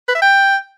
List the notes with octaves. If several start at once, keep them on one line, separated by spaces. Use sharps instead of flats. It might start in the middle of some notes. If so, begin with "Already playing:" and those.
B4
E5
G5